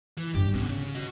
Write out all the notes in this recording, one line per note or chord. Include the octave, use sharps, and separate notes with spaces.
E3
G2 G4
B2 D3 C#4
C#3
F#4 D#5